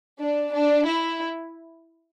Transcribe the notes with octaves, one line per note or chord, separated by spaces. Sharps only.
D4
D4
E4